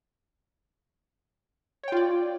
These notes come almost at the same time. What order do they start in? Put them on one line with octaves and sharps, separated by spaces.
C#5 G5 F4 D5